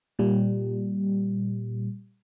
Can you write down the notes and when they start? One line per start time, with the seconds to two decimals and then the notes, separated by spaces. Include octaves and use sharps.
0.19 A#2 G3